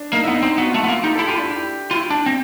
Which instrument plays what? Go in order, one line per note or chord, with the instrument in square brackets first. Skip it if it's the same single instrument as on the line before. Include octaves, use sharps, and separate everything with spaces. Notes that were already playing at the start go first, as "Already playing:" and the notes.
Already playing: [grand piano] D4
[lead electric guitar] A#3 [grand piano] D#4
[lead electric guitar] B3 [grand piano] E4
[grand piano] D#4
[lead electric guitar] C4
[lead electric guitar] B3 [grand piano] F#4
[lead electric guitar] A3 [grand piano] F4
[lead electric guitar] B3 [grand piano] E4
[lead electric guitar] A#3
[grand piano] F4
[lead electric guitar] D#4 [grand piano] G4
[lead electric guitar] E4 [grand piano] A4
[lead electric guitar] F4 [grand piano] G4
[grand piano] D4 [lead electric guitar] E4
[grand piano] G4
[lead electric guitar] F4
E4
D4
C4